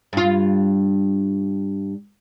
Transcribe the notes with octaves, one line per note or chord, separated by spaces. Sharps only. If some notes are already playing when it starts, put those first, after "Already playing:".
G2 F4